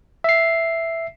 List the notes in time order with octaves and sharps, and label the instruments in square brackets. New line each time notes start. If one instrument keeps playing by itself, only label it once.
[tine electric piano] E5 C7